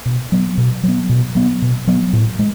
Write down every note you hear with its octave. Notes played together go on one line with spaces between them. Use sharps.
B2
F#3 B3
B2
F#3 B3
B2
F#3 B3
B2
F#3 B3
A2
G#3